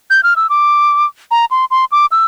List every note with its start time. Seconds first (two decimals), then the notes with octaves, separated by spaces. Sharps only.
0.10 G6
0.23 F6
0.36 E6
0.50 D6
1.31 A#5
1.51 C6
1.71 C6
1.92 D6
2.12 E6